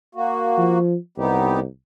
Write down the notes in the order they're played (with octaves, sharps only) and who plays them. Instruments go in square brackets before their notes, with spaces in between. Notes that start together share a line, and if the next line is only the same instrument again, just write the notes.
[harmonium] A#3 F#4
[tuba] F3
[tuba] C2 [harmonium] B3 D#4 G4